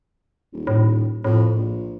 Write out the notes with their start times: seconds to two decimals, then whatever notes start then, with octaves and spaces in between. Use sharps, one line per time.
0.53 D#1
0.67 A2
1.24 F2 A2
1.55 A#1